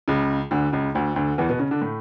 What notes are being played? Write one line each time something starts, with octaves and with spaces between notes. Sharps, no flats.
C#2 C#3
D2 D3
C#2 C#3
D2 D3
D2 D3
E2 E3
B2 B3
C#3 C#4
D3 D4
A2 A3